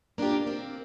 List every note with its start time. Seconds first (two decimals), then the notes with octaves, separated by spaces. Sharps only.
0.18 A#3 D4 D#4 F4 G4
0.47 A#3 C4